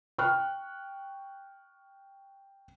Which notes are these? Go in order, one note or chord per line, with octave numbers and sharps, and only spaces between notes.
G5 C#6 F6 F#6